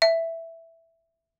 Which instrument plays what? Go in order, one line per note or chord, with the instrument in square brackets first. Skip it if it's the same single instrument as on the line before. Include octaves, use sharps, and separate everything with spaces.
[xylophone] E5